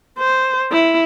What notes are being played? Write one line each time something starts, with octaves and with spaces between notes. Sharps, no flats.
C5
E4